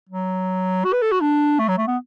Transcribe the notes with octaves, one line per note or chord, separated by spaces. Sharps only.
F#3
F#4
B4
A4
F#4
D4
A3
F#3
A3
B3